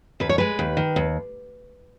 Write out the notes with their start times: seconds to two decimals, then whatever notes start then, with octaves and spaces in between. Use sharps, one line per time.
0.20 D#2 B4
0.29 C#5
0.38 G#3 B4
0.59 D#2
0.77 D#3
0.96 D#2